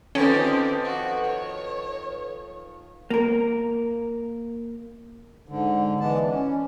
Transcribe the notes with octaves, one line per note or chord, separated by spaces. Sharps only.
D#3 F3 C4 C#4 G4 A4 B4
F#4
C#5
A#3 A#4
G#2 D3
E3 G#3 B3 D4 A5
C#4